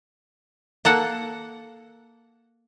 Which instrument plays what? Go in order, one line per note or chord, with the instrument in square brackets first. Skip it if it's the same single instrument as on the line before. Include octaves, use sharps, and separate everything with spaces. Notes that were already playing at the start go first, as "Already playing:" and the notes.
[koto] A#3 A4 F#5